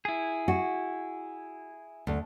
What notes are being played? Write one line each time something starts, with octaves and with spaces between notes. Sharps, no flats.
E4 G#4
F#4
D2